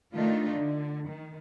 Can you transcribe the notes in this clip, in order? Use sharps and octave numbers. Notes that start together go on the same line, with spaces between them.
D#3 A3 D4 D#4 F4
D3
D#3